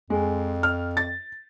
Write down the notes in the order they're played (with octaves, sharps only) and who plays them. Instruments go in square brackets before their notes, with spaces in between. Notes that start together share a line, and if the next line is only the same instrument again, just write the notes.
[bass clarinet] F2 [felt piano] G#3
[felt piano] F6
A6